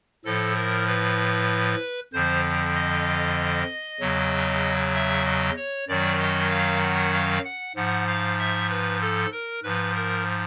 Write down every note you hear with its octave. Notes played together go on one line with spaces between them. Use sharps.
A2 F3 A4
A#4
B4
F2 D3 F3 C5
D#5
E2 C#3 F#3
E5
D#5
C#5
F#2 D#3 F#3 D5
D#5
F5
F#5
F5
F#5
G#2 F3 F#5
F5
E5
B4
A4
A#4
G#2 F3 B4
A#4